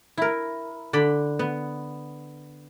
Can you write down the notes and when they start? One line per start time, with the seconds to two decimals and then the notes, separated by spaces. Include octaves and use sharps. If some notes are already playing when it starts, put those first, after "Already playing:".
0.17 E4 A#4
0.93 D3 D5 B5
1.39 B3